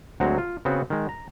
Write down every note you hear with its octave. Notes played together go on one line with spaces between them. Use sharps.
D2 F#3 G#3 C4 F#4 A#5
F4
C#3 B3 C4 F#4
D#3 G#3
A#5